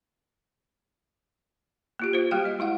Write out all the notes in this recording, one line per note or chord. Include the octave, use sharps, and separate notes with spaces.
A#3 F4 G4
F4 C5
G3 A#3 F#4 G4 F5 G5
D#5
G#3 E4 F5 F#5